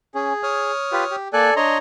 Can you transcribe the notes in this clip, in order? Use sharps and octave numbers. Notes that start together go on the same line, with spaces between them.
C#4 G#4
C#5 D#6 F6
F4 G4 B4
G4
A#3 A4 D5 G#5 F#6
D4 C#5 D#5 A#5 C6